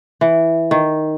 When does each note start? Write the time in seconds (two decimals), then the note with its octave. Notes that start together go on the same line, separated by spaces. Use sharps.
0.21 E3
0.71 D#3